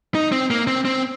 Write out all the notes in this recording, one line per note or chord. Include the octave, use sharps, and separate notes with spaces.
D#4
C4
A#3
C4
C4